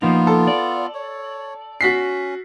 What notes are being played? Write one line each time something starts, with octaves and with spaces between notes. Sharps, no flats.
F3 A#3 B3 D#4 F4
A4
D5
C#5
C#4 F#4 B6 C7